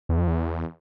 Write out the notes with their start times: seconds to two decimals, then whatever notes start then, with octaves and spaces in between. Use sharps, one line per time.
0.09 E2
0.18 F2
0.27 E2